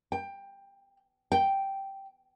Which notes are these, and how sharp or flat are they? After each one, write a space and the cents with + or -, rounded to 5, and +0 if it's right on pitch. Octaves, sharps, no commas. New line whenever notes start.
G5 +15
G5 -5